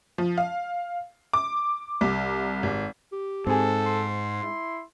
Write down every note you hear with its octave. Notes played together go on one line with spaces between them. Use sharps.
F3
F5
D6
C2
G#1
G4
G#2 C4 G#4 A4
C6
E4